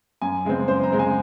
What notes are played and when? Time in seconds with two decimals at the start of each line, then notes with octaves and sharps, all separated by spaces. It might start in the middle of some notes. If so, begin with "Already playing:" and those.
0.22 F#2 G#5
0.45 C#3 G#3 C4
0.68 F#2 C5
0.83 A#5
0.91 C#3 G#3 C4
0.99 G#5